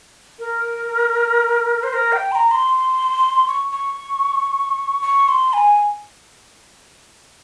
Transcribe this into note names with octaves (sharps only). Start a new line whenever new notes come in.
A#4
C5
A#4
G5
C6
A#5
C6
C#6
C#6
C#6
C6
G#5